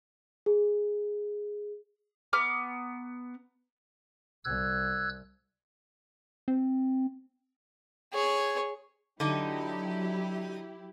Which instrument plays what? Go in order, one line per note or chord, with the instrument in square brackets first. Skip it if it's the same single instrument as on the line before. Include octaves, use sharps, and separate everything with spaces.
[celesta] G#4
[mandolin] B3 A#5 D6 F6
[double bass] C2 [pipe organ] E6 F#6 G#6
[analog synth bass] C4
[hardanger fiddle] G#4 C#5
[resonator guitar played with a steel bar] D3 D#4 [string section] F#3 E4 G4